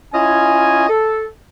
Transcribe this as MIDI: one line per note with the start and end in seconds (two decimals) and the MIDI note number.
0.14 0.88 61
0.14 0.88 64
0.14 0.88 65
0.14 0.88 75
0.14 0.88 80
0.89 1.27 69